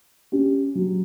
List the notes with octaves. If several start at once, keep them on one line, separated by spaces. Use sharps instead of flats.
C#4 G4
F#3